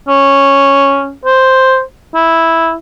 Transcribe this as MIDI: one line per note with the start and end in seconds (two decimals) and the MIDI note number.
0.08 1.13 61
1.25 1.81 72
2.15 2.74 64